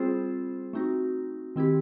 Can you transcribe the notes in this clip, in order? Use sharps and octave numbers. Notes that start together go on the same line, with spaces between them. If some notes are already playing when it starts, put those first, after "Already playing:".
Already playing: G3 C4 F4 G#4 C5
A3 C4 D#4 F#4
D#3 G#3 C4 E4 G4